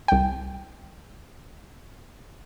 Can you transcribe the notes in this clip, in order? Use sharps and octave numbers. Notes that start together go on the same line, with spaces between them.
C2 G5